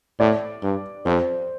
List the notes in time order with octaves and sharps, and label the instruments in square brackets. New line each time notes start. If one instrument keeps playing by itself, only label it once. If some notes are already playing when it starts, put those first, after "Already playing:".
[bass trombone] A2 [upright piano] D5
[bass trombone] G2
[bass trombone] F2 [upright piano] C5